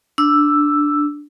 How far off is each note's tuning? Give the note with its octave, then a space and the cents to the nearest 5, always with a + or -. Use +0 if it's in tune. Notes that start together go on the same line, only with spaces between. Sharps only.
D4 +0 E6 +5